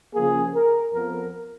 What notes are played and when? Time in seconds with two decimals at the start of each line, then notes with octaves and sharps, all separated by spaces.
0.14 C#3 F3 A#3 G#4
0.54 A#4
0.94 F2 F3 B3 A#4